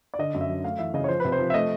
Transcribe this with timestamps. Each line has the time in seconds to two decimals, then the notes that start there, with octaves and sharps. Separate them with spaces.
0.14 D5
0.19 D3 D#5
0.34 F#2
0.41 E5
0.50 F#3
0.64 A3 F5
0.79 E3 E5
0.94 C#3 D#5
1.04 C#5
1.08 F3 C5
1.20 B4
1.25 C3
1.32 C5
1.39 F3
1.50 E5
1.54 A3 D#5